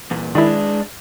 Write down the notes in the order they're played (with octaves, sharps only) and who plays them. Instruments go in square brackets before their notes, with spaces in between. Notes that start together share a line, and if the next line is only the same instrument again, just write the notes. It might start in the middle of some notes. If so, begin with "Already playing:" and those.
[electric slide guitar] E2 A#2
[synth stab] D#3 E4 [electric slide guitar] G#3 D4